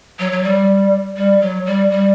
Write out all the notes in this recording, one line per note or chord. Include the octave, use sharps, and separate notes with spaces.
F#3
F#3
G3
G3
F#3
G3
G3